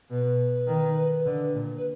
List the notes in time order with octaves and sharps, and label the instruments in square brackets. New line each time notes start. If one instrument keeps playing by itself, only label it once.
[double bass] B2 [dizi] B4
[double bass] D#3
D3
A#2
[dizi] B4